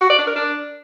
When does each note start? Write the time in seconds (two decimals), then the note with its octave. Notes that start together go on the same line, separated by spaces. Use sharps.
0.01 F#4
0.10 D5
0.18 D4
0.27 A#4
0.36 D4